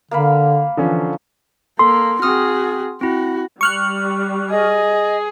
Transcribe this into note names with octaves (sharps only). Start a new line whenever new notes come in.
D3 A#3 F5 B5
D3 E3 F3 C#4
A#3 A4 C6
C4 F#4 G#4 D#6 F6
C4 E4 F#4
G3 C#6 F6 F#6
G#4 D#5